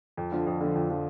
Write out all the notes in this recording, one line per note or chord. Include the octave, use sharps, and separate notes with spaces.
F2
D3 F3
F2
D3 F3
F2
D3 F3